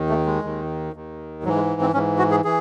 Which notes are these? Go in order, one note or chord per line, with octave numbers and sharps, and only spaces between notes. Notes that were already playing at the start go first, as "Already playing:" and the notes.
Already playing: D#2 D#3
A3
G#3
D#2 D#3
D#2 D#3
G#2 E3 F#3
G#3
C4
G#2 E3 C#4
F#4
G#4
E3 G#4